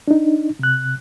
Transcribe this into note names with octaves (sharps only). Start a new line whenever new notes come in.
D4 D#4
C3 F#6